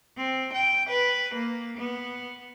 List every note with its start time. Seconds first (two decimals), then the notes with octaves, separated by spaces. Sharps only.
0.17 C4
0.53 G5
0.89 B4
1.34 A#3
1.77 B3